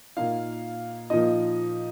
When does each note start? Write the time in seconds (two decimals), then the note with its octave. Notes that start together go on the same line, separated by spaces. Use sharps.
0.17 A#2 A#3 D#4 F5
1.10 A#2 F3 A#3 D#4 D#5